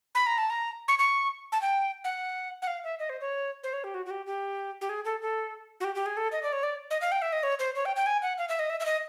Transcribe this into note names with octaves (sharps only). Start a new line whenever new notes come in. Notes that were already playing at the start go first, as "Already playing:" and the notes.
B5
A#5
A5
A#5
C#6
C#6
A5
G5
F#5
F#5
F5
E5
D#5
C5
C#5
C5
C#5
G4
F#4
F#4
G4
G4
G4
G#4
A4
A4
F#4
G4
G4
G#4
A4
D#5
D5
C#5
D5
D#5
F5
G5
E5
D#5
C#5
C5
C#5
G5
G5
G#5
F#5
F5
E5
D#5
E5
E5
D#5